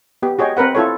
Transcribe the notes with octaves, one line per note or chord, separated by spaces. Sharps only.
B3 G4
F#4 G#4 C#5 D#5 G5
C4 A#4 B4 F#5
E4 F4 A4 C#5